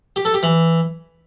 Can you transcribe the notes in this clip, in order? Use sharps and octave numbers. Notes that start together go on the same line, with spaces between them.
G4
A4
G4
E3